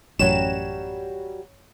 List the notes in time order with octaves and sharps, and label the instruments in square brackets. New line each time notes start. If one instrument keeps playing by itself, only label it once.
[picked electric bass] A1 F#2 [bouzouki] F#3 G3 [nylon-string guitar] C#5 [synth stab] E7